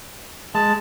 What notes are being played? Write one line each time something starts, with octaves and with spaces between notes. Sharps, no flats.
G#3 A5